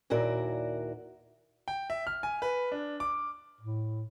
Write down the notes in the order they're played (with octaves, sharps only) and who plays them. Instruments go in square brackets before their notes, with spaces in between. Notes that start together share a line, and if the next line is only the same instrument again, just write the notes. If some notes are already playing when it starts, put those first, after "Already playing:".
[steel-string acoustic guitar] D#2 A#2 E4 F#4 A#4 D5
[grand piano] G5
E5
F6
G#5
B4
D4
D6
[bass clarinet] A2